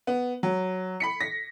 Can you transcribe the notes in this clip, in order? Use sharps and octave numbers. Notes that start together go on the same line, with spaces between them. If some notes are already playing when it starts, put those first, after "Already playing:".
B3
F#3
B5 B6 C#7
A#6 B6